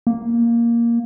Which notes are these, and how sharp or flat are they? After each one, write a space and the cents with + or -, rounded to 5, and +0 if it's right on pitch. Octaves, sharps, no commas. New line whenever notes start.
A#3 +5